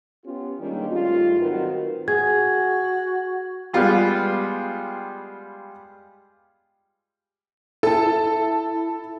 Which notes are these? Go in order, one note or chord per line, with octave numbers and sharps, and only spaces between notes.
B3 C#4 F4 G4
D#3 G3 G#3 A#3 C#4 D4
G#2 G3 A3 F4
D#3 F#3 C4 F#4 A#4 B4
F#4 G#4 G#6
G3 G#3 B3 F4 G4
E4 A4 A5